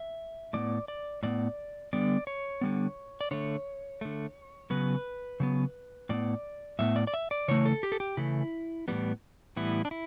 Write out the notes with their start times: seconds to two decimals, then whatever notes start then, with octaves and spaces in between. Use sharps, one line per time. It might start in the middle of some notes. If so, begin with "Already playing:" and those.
Already playing: E5
0.53 A2 G3 B3 D5
0.88 D5
1.23 A2 G3 B3 D5
1.93 D3 G3 B3 D5
2.27 C#5
2.61 D3 G3 B3
3.21 D5
3.31 D3 A3 C#5
4.01 D3 A3
4.70 C#3 F#3 B3 B4
5.40 C#3 F#3 B3
6.09 A2 G3 B3 D5
6.79 A2 G3 B3 E5
6.96 D5
7.07 D5
7.14 E5
7.31 D5
7.48 C#3 E3 A3 C#5
7.66 A4
7.83 G4
7.92 A4
8.00 G4
8.17 C#3 E3 A3 E4
8.88 A2 E3 G3 B3
9.56 A2 E3 G3 B3 E4
9.85 D4
9.91 E4